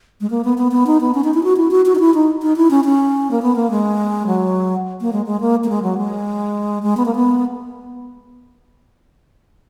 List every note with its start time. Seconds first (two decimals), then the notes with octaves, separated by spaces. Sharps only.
0.21 G#3
0.30 A#3
0.44 B3
0.58 B3
0.72 B3
0.87 D#4
1.01 B3
1.14 C#4
1.24 D#4
1.34 E4
1.44 F#4
1.57 E4
1.71 F#4
1.86 F#4
1.95 D#4
2.00 E4
2.14 D#4
2.42 D#4
2.56 E4
2.71 C#4
2.84 C#4
3.31 A#3
3.42 B3
3.56 A#3
3.71 G#3
4.27 F#3
5.01 A#3
5.13 G#3
5.26 G#3
5.41 A#3
5.64 A#3
5.69 G#3
5.82 F#3
5.98 G#3
6.83 G#3
6.97 B3
7.05 A#3
7.15 B3